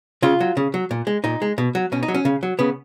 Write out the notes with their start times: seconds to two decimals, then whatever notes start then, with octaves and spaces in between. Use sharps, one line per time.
0.22 C#3 F4
0.41 F#3
0.57 C#3
0.74 F#3
0.91 A#2
1.07 G#3
1.24 A#2 D#4
1.42 G#3
1.58 B2
1.75 F#3
1.92 B2 C#4
2.03 D#4
2.08 F#3
2.15 C#4
2.25 C#3
2.43 F#3
2.59 C#3 B3